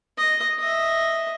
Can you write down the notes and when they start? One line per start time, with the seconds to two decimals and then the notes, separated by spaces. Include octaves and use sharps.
0.18 D#5
0.59 D#5 E5